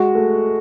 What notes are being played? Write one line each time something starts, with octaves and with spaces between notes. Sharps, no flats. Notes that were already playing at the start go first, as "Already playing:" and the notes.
Already playing: G#3 F#4
A3